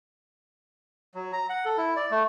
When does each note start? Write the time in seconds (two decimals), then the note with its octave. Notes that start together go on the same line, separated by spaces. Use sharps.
1.15 F#3
1.33 A#5
1.49 F#5
1.65 A4
1.77 E4
1.96 D5
2.11 A3